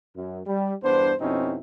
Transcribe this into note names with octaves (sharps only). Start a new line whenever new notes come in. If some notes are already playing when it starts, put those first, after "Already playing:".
F#2
G3
E2 G2 B3 D4 C5
F2 B2 C4 C#4 D#4 E4